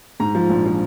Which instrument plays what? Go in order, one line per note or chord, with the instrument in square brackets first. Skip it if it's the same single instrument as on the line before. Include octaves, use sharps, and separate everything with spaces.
[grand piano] G#2 A#5
F3
A#1
F3